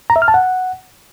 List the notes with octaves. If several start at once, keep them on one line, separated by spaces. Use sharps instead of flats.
A#5
E5
F6
A5
F#5